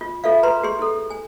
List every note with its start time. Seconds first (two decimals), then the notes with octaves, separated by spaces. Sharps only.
0.01 F4
0.24 F4 A4 E5 F5
0.43 B4 A#5 C6
0.63 G4 G#4 C6
0.79 E4 A4
1.10 G#5